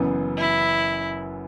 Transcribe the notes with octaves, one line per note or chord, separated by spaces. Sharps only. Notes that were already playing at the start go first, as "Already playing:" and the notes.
Already playing: F#1 F#2 E3 B3
E4